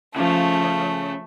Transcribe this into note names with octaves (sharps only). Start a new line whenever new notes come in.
C#3 F3 A3